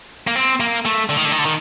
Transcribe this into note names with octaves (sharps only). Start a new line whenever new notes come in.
A#3
C4
A#3
A3
D3
D#3
D3
D#3
D3
D#3